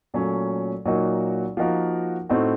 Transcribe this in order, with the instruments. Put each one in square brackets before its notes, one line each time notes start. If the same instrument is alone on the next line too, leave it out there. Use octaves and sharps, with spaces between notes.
[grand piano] A#2 F#3 A3 C#4
A#2 F#3 A#3 D#4 F#4
F3 A#3 D#4 F#4 A#4
A2 A3 C4 D#4 F#4